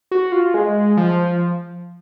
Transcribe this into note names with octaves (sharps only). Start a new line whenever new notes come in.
F#4
F4
G#3
F3